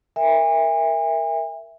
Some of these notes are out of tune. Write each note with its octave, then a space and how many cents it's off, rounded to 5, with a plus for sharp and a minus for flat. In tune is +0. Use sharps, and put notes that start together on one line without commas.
A#4 +0 E5 +0 G#5 -45